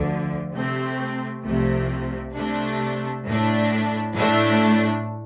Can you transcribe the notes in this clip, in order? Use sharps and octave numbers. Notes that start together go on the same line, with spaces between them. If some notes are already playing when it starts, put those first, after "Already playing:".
Already playing: D2 D3 F3
C3 A3 C4
C2 C3 F3 A3
C3 A3 D4
A2 A3 D4
A2 A3 D4